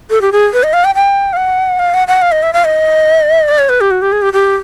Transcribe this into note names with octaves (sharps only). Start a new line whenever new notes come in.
A4
G4
G#4
B4
D#5
F5
G5
G5
F5
F#5
F5
F#5
F#5
F5
D#5
E5
F5
D#5
D5
C#5
B4
G4
F#4
G4
G#4
G4
G4